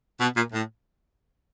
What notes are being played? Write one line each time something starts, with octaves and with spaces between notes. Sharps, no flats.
B2
A#2
A2